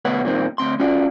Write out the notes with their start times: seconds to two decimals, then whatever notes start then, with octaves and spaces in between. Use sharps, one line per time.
0.05 D2 B2 B4 C#5 F#5
0.23 G2 A#2 D#3 C4
0.58 D2 C4 C6
0.80 C#4 F4 F#4 D5